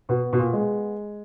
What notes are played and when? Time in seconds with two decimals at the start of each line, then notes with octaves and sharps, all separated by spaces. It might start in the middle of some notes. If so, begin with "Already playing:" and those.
0.09 B2 B3
0.33 B2
0.38 A#2
0.53 G#3